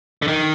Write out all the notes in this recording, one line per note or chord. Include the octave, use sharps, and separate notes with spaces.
D3
D#3